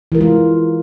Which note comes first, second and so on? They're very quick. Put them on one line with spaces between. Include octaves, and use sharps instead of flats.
E3 A#4 G#3 F4